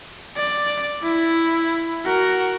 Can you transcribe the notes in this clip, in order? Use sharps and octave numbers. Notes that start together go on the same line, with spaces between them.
D5
E4
F#4 A#4